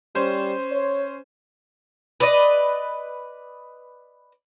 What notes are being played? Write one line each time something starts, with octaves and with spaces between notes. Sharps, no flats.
G3 C#4 C5
C#5
B4 D5 D#5